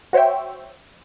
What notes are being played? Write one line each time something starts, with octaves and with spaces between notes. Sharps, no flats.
F#4 C5 C#5 E5 G5